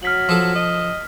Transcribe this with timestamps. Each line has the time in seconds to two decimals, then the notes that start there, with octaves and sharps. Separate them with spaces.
0.03 F#3 F6 B6 F#7
0.29 F3 A4
0.55 D#5